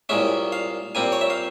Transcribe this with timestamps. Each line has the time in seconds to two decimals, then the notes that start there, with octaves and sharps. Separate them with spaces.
0.09 C2 A#2 G#3 C#4 E5
0.52 F5
0.95 A#2 G3 C4 G#5
1.12 C#5
1.21 E5
1.30 F5